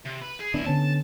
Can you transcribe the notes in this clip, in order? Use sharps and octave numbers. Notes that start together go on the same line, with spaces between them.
C3
B4
G#4
D1 D2 B3 D4 E4
D3 B3 C#4 A5